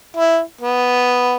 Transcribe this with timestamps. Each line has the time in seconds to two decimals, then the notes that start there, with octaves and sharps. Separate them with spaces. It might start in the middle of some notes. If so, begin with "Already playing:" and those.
0.17 E4
0.61 B3